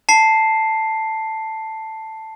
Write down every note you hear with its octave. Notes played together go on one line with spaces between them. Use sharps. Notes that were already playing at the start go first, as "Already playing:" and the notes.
A5 C7